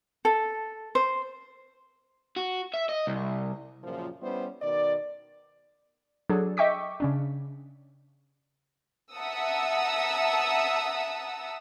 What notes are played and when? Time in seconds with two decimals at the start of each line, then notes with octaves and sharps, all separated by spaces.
0.25 A4
0.95 C5
2.37 F#4
2.74 E5
2.89 D#5
3.07 C2
3.82 F#2 A#2 C#3 F3
4.22 G3 B3 C#4 E4 C5
4.62 B2 D#3 D5
6.30 F#3 D4 G#4 A4
6.57 D#5 E5 G5 C#6 D6 B6
7.00 C#3 C#4 D4
9.13 E5 F#5 A5 A#5 D#6 E6